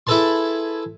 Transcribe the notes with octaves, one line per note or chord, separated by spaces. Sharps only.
E4 G#4 A4 B4 A5 C6